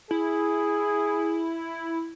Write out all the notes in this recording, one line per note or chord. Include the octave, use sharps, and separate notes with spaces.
E4 G#4